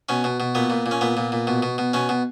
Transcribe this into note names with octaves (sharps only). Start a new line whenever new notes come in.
B2 C#4
B2
B2
A#2 B3
A#2
A#2
C#4
A#2 B3
A#2
A#2
B2
B2
B2
B2 C#4
B2